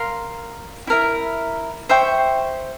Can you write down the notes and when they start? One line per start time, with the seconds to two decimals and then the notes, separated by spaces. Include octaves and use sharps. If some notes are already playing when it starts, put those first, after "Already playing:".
Already playing: A#4 F5 C6
0.87 E4 A#4 E5
1.89 C5 E5 G5 C#6